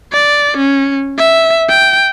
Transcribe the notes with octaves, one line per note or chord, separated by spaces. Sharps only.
D5
C#4
E5
G5